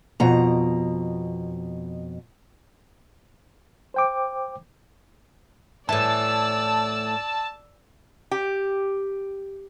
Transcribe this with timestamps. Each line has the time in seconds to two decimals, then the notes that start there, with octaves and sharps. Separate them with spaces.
0.20 F2 B2 A#5
3.94 C5 G5 D6
5.89 A2 E3 D5 A5 E6
8.31 G4